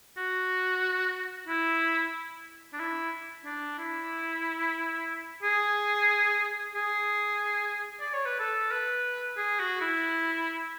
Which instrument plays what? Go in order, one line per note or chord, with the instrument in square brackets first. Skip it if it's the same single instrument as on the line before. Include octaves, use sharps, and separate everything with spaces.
[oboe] F#4
E4
D4
E4
D4
E4
G#4
G#4
D5
C#5
B4
A4
B4
G#4
F#4
E4